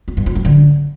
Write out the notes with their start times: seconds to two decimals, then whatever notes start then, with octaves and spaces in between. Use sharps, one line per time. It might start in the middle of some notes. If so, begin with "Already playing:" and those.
0.08 C4
0.17 G2
0.26 F3
0.35 F#3
0.45 D3